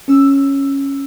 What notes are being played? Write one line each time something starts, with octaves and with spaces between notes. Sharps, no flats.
C#4 E6